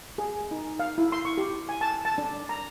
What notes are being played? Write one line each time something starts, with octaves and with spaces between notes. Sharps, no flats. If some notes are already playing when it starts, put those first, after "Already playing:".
G#4
D#4
F5
E4
C6
C#6
G4
G#5
A5
A5
D4
A#5